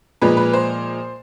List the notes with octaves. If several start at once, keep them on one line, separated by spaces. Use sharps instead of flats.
A#2 F3 G#3 B4
B4
C5